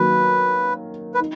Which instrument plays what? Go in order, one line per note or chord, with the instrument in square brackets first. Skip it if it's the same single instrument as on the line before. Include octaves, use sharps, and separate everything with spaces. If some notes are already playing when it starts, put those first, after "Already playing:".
Already playing: [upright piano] D#3 F#3 A#3 [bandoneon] B4
[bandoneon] B4
[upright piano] D#4